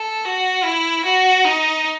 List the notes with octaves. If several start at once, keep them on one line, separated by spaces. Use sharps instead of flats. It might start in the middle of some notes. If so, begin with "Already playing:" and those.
Already playing: A4
F#4
E4
F#4
D#4